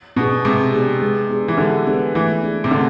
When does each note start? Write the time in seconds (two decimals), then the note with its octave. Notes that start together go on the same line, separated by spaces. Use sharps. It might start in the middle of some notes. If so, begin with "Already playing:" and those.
0.16 B2 B3 D4 G#4
0.45 C3 G#3
0.74 B3 D4 G#4
1.02 G#3
1.30 B3 D4 G#4
1.48 E3
1.58 D3 G#3
1.87 B3 D4 G#4
2.15 E3 A3
2.43 D4 G#4
2.64 C3
2.71 D3 A3